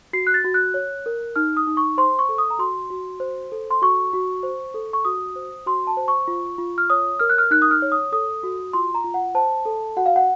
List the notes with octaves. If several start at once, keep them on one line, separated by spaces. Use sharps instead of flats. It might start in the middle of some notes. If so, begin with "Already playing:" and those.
F#4 C7
F#6
A6
F#4
F#6
C#5
A#4
D#4 F6
D#6
D#4
C#6
C5 C6
C#6
A4
D#6
A#5
F#4 C6
F#4
C5
A4
C6
F#4 C#6
F#4
C5
A4
C#6
F#4 D#6
C5
F#4 C6
A5
C5
C#6
F4
F4
F6
C#5 D#6
A#4 F6
F#6
F6
D#4 F#6
D#6
F6
C#5
D#6
A4 D#6
F#4
F4 C6
A#5
F4
F#5
C5 A5
A4
F#4 F#5
F5
F#5